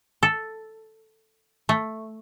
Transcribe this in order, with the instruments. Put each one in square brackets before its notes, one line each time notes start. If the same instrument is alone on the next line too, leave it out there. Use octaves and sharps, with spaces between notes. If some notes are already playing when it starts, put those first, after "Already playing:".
[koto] A4
A3